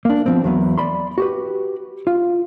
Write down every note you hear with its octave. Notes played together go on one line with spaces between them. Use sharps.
A#3 D4
F3 B3 C4
E2 F#3 B3
D5 B5 C6
F#4 G4 B4
F4